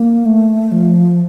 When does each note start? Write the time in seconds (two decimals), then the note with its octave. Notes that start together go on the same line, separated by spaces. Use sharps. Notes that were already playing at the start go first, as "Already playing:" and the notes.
Already playing: A#3
0.25 A3
0.72 F3